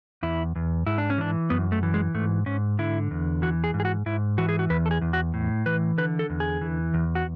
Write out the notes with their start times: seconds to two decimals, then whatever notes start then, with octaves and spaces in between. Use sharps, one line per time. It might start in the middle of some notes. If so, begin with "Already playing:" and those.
0.23 E2 E4
0.56 E2
0.86 G#2 E4
0.98 D4
1.10 C#4
1.18 E3 D4
1.50 F#2 B3
1.72 A3
1.83 E3
1.94 G#3
2.14 G#2 A3
2.46 G#2 C#4
2.79 D3 E4
3.11 E2
3.42 E3 F#4
3.64 G#4
3.74 G#2
3.80 G#4
3.85 F#4
4.06 G#2 E4
4.38 E3 F#4
4.49 G#4
4.59 F#4
4.70 E2 B4
4.86 A4
4.91 G#4
5.01 E2
5.13 F#4
5.34 A2
5.66 E3 B4
5.98 D3 B4
6.19 A4
6.30 E2
6.40 G#4
6.61 E3
6.94 E2
7.15 F#4